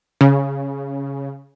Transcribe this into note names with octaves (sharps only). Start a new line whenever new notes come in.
C#3